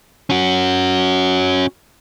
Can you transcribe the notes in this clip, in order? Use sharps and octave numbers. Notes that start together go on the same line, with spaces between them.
C#4 F#4